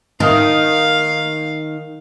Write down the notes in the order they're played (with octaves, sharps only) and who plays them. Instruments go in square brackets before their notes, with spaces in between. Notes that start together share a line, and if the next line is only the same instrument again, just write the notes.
[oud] D#3 [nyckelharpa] F5